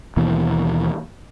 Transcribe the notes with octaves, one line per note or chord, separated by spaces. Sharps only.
D#2 B2 E3 A#3